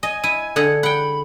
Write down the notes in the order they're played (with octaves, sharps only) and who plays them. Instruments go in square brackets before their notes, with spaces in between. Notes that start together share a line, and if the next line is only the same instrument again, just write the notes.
[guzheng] D#5 [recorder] G#5
[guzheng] E4 [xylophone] D#7
[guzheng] D3 G#4 F#5 [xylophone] A4
[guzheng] F#5 G5 [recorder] B5